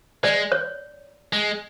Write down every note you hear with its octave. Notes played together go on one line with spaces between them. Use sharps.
G#3 D5
C#5
G#3